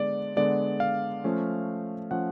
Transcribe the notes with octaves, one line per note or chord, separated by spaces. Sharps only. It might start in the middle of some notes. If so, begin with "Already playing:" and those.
Already playing: D3 G#3 B3 D5
D3 G#3 B3 D5
F5
F3 A3 C#4
F3 A3 C#4 F#5